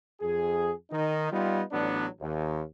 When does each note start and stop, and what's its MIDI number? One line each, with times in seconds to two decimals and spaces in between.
0.21 0.71 41
0.21 0.71 68
0.91 1.30 51
0.91 1.30 63
1.31 1.61 55
1.31 1.61 59
1.31 1.61 63
1.31 1.61 65
1.71 2.06 33
1.71 2.06 54
1.71 2.06 59
1.71 2.06 62
2.21 2.61 39